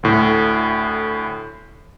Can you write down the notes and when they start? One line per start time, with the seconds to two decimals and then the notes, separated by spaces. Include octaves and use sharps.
0.03 D2 A2